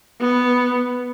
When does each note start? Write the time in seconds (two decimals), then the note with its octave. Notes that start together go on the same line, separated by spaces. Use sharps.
0.20 B3